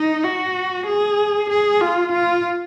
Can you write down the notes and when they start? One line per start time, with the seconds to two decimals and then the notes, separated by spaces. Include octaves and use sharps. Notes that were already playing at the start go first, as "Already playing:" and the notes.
Already playing: D#4
0.24 F#4
0.87 G#4
1.50 G#4
1.81 F4
2.12 F4